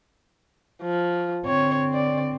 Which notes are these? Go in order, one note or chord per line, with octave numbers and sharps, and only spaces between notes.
F3
D3 C4 C#5
D5